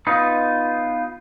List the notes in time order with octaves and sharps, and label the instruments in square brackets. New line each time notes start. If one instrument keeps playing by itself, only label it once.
[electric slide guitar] B3 D#4 F4